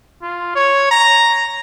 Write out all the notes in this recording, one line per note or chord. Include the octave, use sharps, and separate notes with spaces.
F4
C#5
A#5